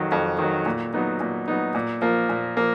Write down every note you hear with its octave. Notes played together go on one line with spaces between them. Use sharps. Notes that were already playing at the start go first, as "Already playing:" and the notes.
Already playing: F2 D#3 F#3
F2
D#3 F#3
A#2
F#3 B3 D#4
A#2
F#3 B3 D#4
A#2
F3 A#3
A#2
F3 A#3